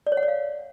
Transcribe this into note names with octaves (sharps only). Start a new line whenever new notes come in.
D5
C#5
F#5
D5
F5